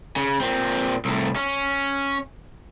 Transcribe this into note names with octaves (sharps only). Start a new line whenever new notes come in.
C#3
A#2 C4
C2 A2
C#4